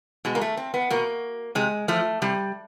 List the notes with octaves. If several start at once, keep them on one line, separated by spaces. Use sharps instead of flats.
B2 G#3
A#3
A3
C4
B3
B2 A#3
C3 G#3
F3 A3
C3 G3